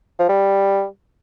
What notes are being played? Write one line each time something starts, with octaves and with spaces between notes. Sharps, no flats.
F3
G3